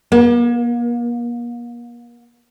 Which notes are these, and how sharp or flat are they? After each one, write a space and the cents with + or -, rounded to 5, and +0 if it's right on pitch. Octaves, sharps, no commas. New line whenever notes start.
A#3 +40